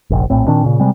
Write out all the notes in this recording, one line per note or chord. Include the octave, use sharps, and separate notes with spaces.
F1 A#1
A#1 A2 C4
A#2 D#3 C4 D4
A#2 C#3
C3 G3 G#3 C4